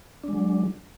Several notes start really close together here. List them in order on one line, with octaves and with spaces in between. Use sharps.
D4 G#3 F#3